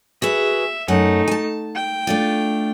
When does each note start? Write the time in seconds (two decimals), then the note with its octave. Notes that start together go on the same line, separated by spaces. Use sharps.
0.22 F#4 G#4 B4 E5
0.88 F#2 A3 D#4 F#5
1.28 G#5 A5
1.75 G5
2.07 A3 D4 F4